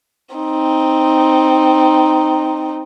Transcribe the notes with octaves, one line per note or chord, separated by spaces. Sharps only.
C4 D#4